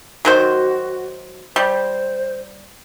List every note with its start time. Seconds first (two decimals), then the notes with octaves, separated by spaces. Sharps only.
0.25 D#3 F#3 F#4 C5
1.56 G3 C5